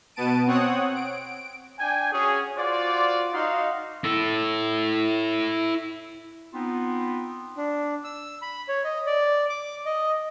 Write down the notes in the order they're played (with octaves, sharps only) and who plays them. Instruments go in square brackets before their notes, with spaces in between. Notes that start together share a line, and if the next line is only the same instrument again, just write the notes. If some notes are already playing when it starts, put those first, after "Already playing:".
[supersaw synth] B2 B3 A5 D7 D#7
C4 C#5 F#5 D#6 F#6
D7
[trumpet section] D4 G5 G#5
C#4 F#4 G#4
F4 F#4 C5 D5
D#4 F#4 D#5 F5 C6
[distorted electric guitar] E4 A4
[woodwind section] B3 C4 D#4 F4
[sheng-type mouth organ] D4
E6
B5
C#5
D#5
D5
D6
D#5